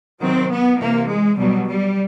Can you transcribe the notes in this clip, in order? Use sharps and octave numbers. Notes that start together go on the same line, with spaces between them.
C3 D#3 F#3 C4
B3
C3 E3 A#3
G#3
B2 F#3 G3
G3